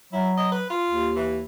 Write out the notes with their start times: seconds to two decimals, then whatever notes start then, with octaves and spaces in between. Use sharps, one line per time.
0.13 F#3 E4
0.37 D#5
0.51 B4
0.70 F4
0.87 D#2
1.16 E3